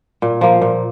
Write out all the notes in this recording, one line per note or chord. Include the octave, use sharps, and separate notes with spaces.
A#2
F3 A#3
A#2